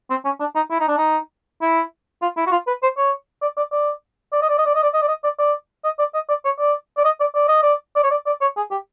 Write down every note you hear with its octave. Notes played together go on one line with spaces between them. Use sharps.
C4
C#4
D4
D#4
E4
D#4
D4
D#4
E4
F4
E4
F#4
F4
B4
C5
C#5
D5
D5
D5
D5
D#5
D5
D#5
D5
D#5
D5
D#5
D5
D#5
D5
D5
D#5
D5
D#5
D5
C#5
D5
D5
D#5
D5
D5
D#5
D5
D5
C#5
D5
D5
C#5
G#4
G4